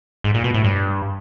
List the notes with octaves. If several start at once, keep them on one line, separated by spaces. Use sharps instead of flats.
G#2
A#2
B2
A2
G2